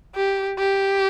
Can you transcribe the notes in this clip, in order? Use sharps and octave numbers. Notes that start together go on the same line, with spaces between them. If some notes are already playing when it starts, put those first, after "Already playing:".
G4
G4